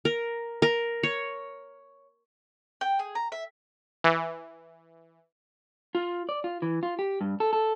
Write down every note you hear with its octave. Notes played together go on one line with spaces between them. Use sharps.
A#4
A#4
C#5
G5
G#4
A#5
E5
E3
F4
D5
F4
E3
F4
G4
G2
A4
A4